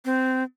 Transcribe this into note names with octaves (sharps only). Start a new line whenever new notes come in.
C4